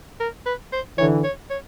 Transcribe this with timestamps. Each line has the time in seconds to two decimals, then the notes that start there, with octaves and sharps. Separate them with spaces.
0.20 A#4
0.46 B4
0.73 C5
0.98 D3 E3 C#5
1.24 C#5
1.50 C#5